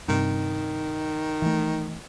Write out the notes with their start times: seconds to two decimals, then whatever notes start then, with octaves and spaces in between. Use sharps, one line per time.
0.08 G2 C3 D#3
1.42 E3 A3